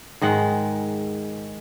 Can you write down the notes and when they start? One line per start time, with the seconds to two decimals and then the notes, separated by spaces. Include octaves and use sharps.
0.21 G#2 D#3 G#3 F#5